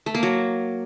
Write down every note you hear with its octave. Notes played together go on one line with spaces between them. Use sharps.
A3
A#3
F#3